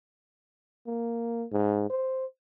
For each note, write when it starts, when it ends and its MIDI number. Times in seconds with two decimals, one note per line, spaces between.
0.87 1.45 58
1.52 1.89 44
1.90 2.25 72